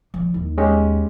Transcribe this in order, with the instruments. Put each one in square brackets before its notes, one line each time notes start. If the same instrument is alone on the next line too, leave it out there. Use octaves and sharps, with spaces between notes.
[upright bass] F3 G3
D#2
[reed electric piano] G#3 C#4 G4